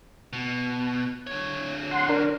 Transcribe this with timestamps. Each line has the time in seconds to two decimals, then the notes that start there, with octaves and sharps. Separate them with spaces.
0.33 B2
1.27 D3 C#5
1.91 F#5 C6
2.09 D4 A#4